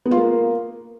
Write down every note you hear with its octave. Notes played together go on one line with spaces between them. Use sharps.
B3
F4
A#3